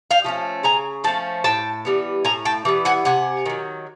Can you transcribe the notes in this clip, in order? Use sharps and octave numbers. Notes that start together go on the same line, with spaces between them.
F5 G5
F3 A3 C#4
C#3 G#5 A#5
F3 A3 C#4 A5
A2 G5 A5
E3 G3 B3
A2 G#5 A#5
G5 A5
E3 G3 B3
F#5 G#5
C3 F#5 G#5
D#3 F#3